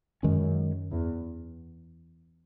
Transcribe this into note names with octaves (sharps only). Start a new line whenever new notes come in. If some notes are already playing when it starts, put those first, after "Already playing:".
F#2 D#3 G#3 C#4
E2